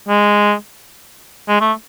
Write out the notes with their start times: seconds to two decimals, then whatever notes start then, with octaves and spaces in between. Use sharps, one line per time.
0.08 G#3
1.48 G#3
1.61 A3